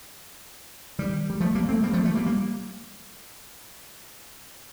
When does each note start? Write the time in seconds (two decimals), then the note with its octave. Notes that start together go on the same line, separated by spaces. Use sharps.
0.99 D#3 G3
1.30 G3
1.40 F3 A3
1.55 G3 A#3
1.69 A3 C4
1.83 G3 A#3
1.93 F3 A3
2.05 F3 A3
2.15 G3 A#3
2.26 G3 A#3